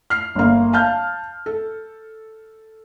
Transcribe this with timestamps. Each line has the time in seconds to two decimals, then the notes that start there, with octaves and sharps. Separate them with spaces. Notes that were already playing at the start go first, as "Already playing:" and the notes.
0.10 F6 C7
0.35 G1 A#3
0.73 F5 A5 F6 G6
1.46 A4